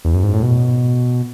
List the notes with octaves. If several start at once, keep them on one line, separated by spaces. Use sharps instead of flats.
E2
F#2
G#2
A2
B2